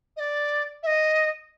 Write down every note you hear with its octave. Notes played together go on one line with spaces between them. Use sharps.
D#5
D5
E5
D#5